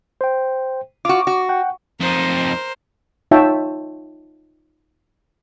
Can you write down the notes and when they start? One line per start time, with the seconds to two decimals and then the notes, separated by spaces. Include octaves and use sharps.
0.21 C5 G5
1.05 F4 F#4 D6
1.27 F#4
1.49 F#5 G5
2.00 F2 D#4 A#4 C5
3.31 D#4 F4 C#5 E5 G5 A5